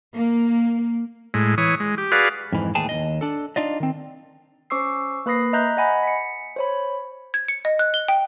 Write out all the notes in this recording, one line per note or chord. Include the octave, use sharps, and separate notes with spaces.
A#3
A2 G#3
E3 C#5 D#6
G#3
G4
F#4 G#4 B4 D5 F5
F2 G#2 E3
D#2 A2 E3 G#4 G5 A5
D#2 B2 D#5
D4 A4
D4 D#4 F4 D5 D#5
D#3 C4
C#4 C5 C#6 D6 E6 C7
A#3 B4 B5 D#6 A#6 C7
D#5 E5 A#5 F#6 G6
D#5 F#5 G#5 B5
B6 C#7
C5 C#5 B5
G#6
C#7
D#5
F#6
G7
G5